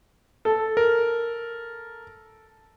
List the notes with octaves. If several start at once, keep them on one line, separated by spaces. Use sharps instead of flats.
A4
A#4